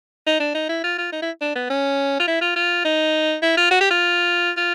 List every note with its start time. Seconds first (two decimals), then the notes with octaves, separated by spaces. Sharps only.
0.27 D#4
0.40 D4
0.55 D#4
0.69 E4
0.84 F4
0.98 F4
1.12 D#4
1.22 E4
1.41 D4
1.55 B3
1.70 C#4
2.20 F4
2.27 E4
2.41 F4
2.56 F4
2.85 D#4
3.42 E4
3.57 F4
3.71 F#4
3.81 G4
3.91 F4
4.57 F4